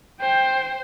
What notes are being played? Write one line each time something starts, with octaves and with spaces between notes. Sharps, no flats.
C5 G5